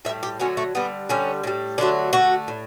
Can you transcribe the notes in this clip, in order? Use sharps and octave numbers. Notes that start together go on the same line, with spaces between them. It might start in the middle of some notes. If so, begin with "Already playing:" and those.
A2 G3 E5
G4
D3 F#3 A3 C#4
A3
D3 G3 B3
D3 G3 C#4
A2 G3
D3 F#3 A3 D4
D3 A3 F#4
A2